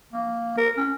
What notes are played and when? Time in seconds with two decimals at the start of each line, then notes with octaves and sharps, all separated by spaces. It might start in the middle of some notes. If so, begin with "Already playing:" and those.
0.13 A#3
0.57 A#4
0.77 C#4